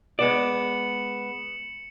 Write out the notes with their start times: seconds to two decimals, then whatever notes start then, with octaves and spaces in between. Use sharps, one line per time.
0.19 G#3 B3 D5 C#7 E7 F#7